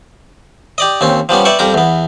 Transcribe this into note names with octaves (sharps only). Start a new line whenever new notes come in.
G4 D5 D#5
D#2 C4 C#4
F3 G3 B3 C#4
B4 D5 E5 G5 C#6
F2 G3 A#4 A#5
E2 B3